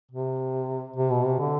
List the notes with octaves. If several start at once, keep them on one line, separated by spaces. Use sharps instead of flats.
C3
C3
B2
C3
D3